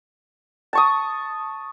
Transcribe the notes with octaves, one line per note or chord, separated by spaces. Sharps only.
A5 C#6 D#6